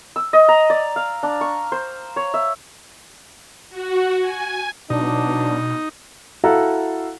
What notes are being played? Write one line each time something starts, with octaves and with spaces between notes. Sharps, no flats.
E6
D#5
A#5
D5
F5
D4
C#6
C5
C#5
E5
F#4
G#5
B2 E3 F#3 D4 D#4
E4 F#4 A4 F5 F#5 A#5